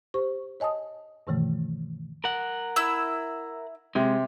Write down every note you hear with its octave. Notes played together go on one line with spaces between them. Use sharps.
G4 C5 C#6
C#5 D#5 G#5 A5 D#6
G2 B2 D#3 E3 A3
A#4 F#5
E4 E6
C3 G#3